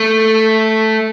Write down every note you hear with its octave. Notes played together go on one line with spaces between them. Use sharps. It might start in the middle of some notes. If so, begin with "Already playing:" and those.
Already playing: A3